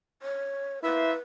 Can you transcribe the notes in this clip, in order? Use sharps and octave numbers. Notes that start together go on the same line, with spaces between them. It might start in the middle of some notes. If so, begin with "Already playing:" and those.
C#5
A#3 E4 B4 C5 E5